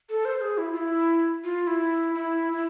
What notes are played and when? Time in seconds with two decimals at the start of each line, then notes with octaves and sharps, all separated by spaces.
0.09 A4
0.25 C5
0.41 G#4
0.58 E4
0.73 F4
0.77 E4
1.44 F4
1.67 E4
2.15 E4
2.52 E4